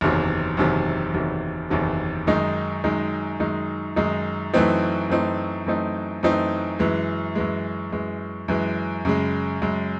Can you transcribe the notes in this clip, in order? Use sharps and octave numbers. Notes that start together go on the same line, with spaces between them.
F#1 E2 C3 D#3 F#3
F#1 E2 C3 D#3 F#3
F#1 E2 C3 D#3 F#3
F#1 E2 C3 D#3 F#3
F#2 D#3 G#3 D#4
F#2 D#3 G#3 D#4
F#2 D#3 G#3 D#4
F#2 D#3 G#3 D#4
F#2 E3 A3 C4 D#4
F#2 E3 A3 C4 D#4
F#2 E3 A3 C4 D#4
F#2 E3 A3 C4 D#4
F#2 E3 G#3
F#2 E3 G#3
F#2 E3 G#3
F#2 E3 G#3
F#2 C#3 G#3
F#2 C#3 G#3